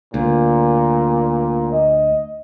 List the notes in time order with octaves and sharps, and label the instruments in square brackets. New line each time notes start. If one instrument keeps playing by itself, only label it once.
[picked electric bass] D2 [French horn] A#2
[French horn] D#5